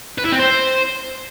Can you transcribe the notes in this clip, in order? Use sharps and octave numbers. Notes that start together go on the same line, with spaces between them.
B4
E4
C4
C5